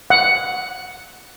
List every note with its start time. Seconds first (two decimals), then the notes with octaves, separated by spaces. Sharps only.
0.10 F#5